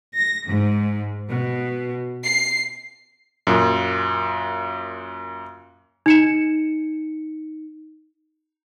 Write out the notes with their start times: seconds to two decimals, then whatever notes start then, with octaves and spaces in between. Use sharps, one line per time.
0.13 A#6
0.46 G#2
1.28 B2
2.25 C7
3.47 F#2 A#2
6.06 D#4 C#7 E7